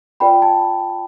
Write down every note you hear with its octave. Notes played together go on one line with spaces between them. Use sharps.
F4 B4 D5 G5 B5
A5